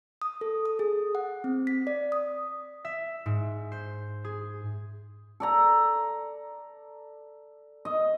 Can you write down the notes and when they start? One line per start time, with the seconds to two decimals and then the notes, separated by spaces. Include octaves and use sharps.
0.22 D#6
0.41 A4
0.65 D#6
0.79 G#4
1.15 F#5
1.44 C4
1.67 B6
1.87 D5
2.12 D#6
2.85 E5
3.26 G#2
3.72 C5
4.24 G#4
5.40 A4 D5 A#5
7.85 D#5